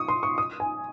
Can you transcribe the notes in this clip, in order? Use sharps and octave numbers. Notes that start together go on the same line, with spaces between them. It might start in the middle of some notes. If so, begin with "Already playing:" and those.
Already playing: C#6 D#6
C6
C#6
D#6
G#5